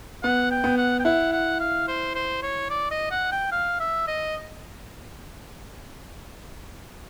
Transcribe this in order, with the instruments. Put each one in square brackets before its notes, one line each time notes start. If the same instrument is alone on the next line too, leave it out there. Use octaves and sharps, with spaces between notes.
[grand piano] B3 [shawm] F#5
[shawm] G5
[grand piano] B3
[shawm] F#5
G5
[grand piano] E4 [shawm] F#5
[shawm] F#5
F5
C5
C5
C#5
D5
D#5
F#5
G5
F5
E5
D#5